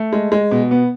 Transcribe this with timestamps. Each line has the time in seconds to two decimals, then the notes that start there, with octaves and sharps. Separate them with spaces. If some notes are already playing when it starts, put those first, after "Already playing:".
Already playing: A3
0.13 G#3
0.32 G#3
0.51 B2
0.71 B3